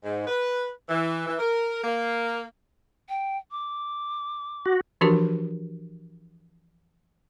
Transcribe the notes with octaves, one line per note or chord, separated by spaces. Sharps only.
G#2
B4
E3
E3
A#4
A#3
G5
D6
F#4
E3 F3 D4 F#4 G4 A#4